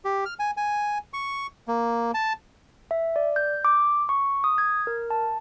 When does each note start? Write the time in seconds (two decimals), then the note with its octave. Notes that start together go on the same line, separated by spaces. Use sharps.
0.05 G4
0.25 F6
0.39 G#5
0.57 G#5
1.13 C#6
1.68 A#3
2.14 A5
2.91 E5
3.16 D5
3.36 G6
3.65 D6
4.09 C#6
4.44 D#6
4.58 G#6
4.87 A#4
5.10 A5